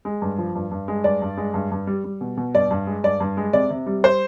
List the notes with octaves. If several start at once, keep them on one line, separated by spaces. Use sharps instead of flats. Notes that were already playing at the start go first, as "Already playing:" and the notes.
G#3
G2
F3
G2
G2
G#3
G2 D5
G2
G#3
G2
G2
G3
G3
B2
B2
G2 D5
G2
G#3
G2 D5
G2
G#3
C3 D5
C3
G3
C5